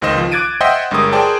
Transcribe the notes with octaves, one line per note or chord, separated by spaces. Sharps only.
G#1 C#2 D#3 C5 D#5 E7
F3
D6 F#6 G#6 A6 D7 D#7
C5 D#5 E5 F#5 G5 C6
G1 G2 G#3 A#4 D#6
G#4 A#4 C5 D5 G5 A5